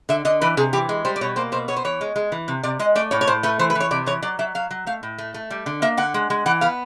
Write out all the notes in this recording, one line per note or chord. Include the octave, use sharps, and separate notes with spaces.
D3 E5
D3 D#5
E3 B4
C3 G#4
E3 G4
G#3
G3 C5
D5
B2 C#5
A#3 C5
B2 C5
B3 C#5
C5
E3 C#5
G#3
G#3
E3
C3
C3 D5
G#3 D#5
A3 D5
A2 C#5
C#5
A2 C5
A3 B4
E3 C5
B4
E3
C#5
C3 D5
E3 C#5
F#3 D5
F#3 E5
F#3 F5
F#3
A3 F5
A2
A3
A3
G3
D3
A#3 E5
D3 F#5
G#3
G#3
E3 F#5
B3 F5